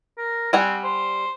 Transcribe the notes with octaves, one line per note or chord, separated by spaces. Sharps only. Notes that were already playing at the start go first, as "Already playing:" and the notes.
A#4
G3 C4 F#5 G#5
C5